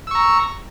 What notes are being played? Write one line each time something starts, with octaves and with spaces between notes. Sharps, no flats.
A#5 C#6 E6